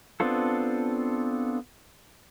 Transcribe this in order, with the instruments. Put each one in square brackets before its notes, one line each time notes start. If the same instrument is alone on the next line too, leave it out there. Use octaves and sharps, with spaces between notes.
[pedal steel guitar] B3 C4 D4 F4 A4